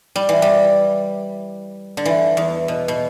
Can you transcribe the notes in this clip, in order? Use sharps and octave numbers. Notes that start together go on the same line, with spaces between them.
G3
E3
G3
D3
E3
E2
B2
B2